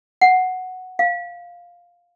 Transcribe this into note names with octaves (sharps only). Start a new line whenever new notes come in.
F#5
F5